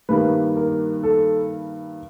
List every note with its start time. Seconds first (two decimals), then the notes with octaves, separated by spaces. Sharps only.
0.09 G2 D#3 G3 A#3 B4
0.57 A#4
1.03 A4